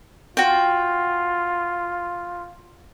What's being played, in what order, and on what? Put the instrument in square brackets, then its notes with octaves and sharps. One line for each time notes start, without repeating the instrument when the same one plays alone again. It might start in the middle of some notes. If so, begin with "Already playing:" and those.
[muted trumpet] F4 [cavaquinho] F#4 G5